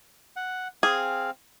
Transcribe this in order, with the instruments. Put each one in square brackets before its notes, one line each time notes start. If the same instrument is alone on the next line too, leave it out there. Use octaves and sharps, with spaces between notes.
[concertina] F#5
[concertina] C4 F5 [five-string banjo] G#4